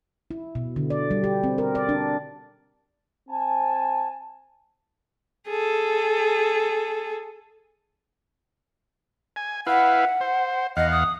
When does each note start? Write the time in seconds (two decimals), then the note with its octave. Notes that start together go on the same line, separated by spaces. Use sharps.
0.31 E4
0.55 B2
0.76 D3
0.90 D5
1.11 G3
1.24 G4
1.44 C4
1.58 A#4
1.75 D5
1.89 D4
3.29 C4 G#5 A5
5.48 G#4 A4
9.36 G#5
9.67 E4 B4 F5 F#5
10.21 C5
10.77 E2 D#5 F5 F#5
10.91 D#6